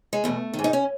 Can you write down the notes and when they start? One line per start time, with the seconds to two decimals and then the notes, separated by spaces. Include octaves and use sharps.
0.13 G#3
0.24 E2 B2 A3
0.53 D#3
0.59 G#2
0.64 D#4
0.73 C#4